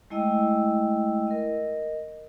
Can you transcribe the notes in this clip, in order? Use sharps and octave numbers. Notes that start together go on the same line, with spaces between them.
G#3 A3 E4 D#5 G5 E6
A#4 D#5